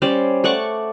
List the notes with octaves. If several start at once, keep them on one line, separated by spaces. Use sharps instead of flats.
G3 C#4 C5 D5
A3 D5 F#5 C#6